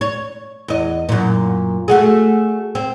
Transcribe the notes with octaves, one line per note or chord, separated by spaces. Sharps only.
C#5
E2 D#5
F#2 A#2
A3 F#4 G#4
C4